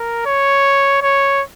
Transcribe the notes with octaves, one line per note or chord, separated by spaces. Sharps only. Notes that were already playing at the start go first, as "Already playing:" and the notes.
Already playing: A#4
C#5
C#5